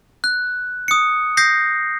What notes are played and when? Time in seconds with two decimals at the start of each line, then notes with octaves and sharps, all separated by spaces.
0.24 F#6
0.88 D#6 C#7
1.37 D#6 G6 A#6 C7